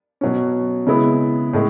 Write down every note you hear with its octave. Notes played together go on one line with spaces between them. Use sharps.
B2 F#3 C#4
C#3 G#3 B3 E4
A2 G#3